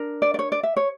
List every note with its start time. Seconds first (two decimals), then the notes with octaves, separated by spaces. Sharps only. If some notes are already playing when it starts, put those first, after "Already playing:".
Already playing: D4 A#4
0.22 D5
0.34 D5
0.39 C#5
0.52 D5
0.63 E5
0.77 C#5